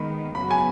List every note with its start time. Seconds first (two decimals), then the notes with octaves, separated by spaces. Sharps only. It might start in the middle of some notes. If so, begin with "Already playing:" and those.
Already playing: D#3 G#3 B3 B5
0.35 F#2 C#3 B3 F#4 B5
0.51 G#5